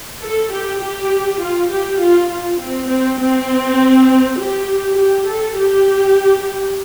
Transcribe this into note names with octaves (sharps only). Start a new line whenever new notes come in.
A4
G4
G4
F4
G4
F4
F4
C4
C4
C4
G4
G4
A4
G4